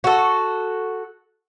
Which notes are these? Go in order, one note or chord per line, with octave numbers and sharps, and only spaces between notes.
F#4 A4